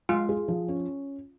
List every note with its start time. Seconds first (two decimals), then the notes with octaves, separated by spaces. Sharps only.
0.09 G#3 F4
0.29 G#4
0.48 F3
0.68 C#4